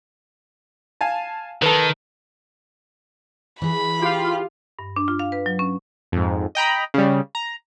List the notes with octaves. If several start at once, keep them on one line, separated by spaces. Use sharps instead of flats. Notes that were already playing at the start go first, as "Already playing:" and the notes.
F5 G#5 A5
D#3 A4 B4
E3 G#4 B5
F4 G4 F5
G2
D4
F4
F5
B4
F#3
C#4
F2 G#2
D#5 G5 A#5 B5
C#3 G3
A#5